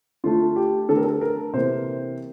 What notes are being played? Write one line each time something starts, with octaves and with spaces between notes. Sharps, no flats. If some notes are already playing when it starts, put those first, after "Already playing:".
D3 A3 F4
G4
D3 A3 A4 A#4
A4
A#4
C3 E3 A#3 C5